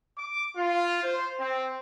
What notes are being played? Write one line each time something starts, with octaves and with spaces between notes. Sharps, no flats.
D6
F4
C5
C4